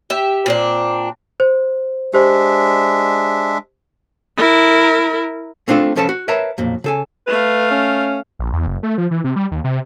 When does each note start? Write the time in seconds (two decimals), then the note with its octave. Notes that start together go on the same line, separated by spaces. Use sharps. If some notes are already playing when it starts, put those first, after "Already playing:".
0.10 G4 E5
0.46 A#2 C4 D4
1.40 C5
2.14 G#3 D4 G4 C5 E5
4.38 E4 A#4
5.68 A3 C4 D4 F4 A4
5.96 C2 F3 C#4 A4 B4 A5
6.09 F#4
6.28 A#4 B4 C#5 E5 A5 A#5
6.58 B1 F2 A#2
6.84 C#3 A4 G#5
7.27 A3 B4 F5
7.71 C#4
8.39 A#1
8.53 E2
8.67 F#1
8.83 A3
8.98 F3
9.11 E3
9.24 C3
9.36 G3
9.51 D#2
9.64 C3